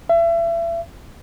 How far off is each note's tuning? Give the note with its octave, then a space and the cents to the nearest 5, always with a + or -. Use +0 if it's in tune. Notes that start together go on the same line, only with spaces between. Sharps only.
E5 +35